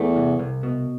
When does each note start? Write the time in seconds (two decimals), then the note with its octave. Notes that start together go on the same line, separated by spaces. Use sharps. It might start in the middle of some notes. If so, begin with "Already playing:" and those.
Already playing: E2 A3
0.16 C2
0.39 C2
0.63 B2